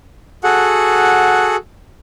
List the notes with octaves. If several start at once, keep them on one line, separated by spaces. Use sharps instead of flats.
F#4 G#4 A4 F#5